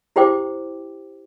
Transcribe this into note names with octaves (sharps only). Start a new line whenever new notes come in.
E4 G4 C5 G5 D6